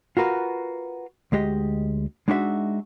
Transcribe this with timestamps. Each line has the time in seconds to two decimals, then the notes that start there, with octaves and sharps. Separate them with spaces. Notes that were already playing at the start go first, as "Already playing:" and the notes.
0.17 F4 F#4 A#4 B4
1.32 D2 G#3 G4 D#5
2.28 G#3 D4 D#4 F#4 B4 E5